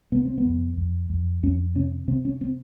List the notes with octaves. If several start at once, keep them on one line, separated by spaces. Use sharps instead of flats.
C3 B3
C4
B3
F2
F2
F2
F2 C#4
C3 C#4
C3 C4
C#4
C4